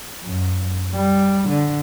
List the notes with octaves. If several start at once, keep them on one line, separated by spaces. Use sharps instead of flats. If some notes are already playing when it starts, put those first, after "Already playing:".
F#2
G3
D3